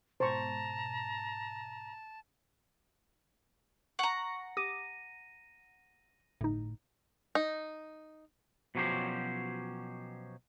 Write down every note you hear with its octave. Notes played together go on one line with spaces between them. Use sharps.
G#2 B2 C5 A5 A#5 C#6
F#5 A#5 C#6
G4 D6 D#6 A#6 D#7
G1 A2 D#4
D#4
B2 F3 F#3 C#4 G4 C5